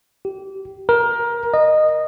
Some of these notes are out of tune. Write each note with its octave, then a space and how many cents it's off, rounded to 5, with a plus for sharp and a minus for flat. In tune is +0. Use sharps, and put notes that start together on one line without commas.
G4 -25
A#4 +20
D#5 -15